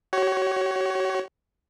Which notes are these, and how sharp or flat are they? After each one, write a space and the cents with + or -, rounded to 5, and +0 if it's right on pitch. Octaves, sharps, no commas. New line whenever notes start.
F#4 +40 C#5 +0